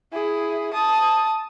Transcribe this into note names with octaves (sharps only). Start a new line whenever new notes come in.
E4 G#4
A5 D#6